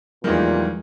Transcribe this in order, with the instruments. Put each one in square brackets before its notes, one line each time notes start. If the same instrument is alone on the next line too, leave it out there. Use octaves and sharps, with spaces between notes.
[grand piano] E2 D#3 [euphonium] A#2 [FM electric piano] F3 G#3 [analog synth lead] G3